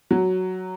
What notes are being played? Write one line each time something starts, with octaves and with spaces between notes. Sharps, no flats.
F#3